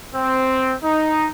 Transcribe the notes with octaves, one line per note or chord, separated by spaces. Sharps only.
C4
D#4